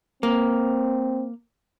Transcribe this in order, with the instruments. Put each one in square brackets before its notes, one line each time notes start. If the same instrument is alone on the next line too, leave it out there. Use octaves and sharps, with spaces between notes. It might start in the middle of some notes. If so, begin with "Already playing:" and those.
[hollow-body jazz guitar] A#3 [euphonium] C4